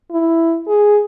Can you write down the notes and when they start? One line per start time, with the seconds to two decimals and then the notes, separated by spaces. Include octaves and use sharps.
0.12 E4
0.69 G#4